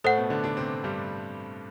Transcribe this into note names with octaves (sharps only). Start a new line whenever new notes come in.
A2 A3 A4 C5 F#5
B2 B3
D3 D4
D3 D4
C3 C4
G2 G3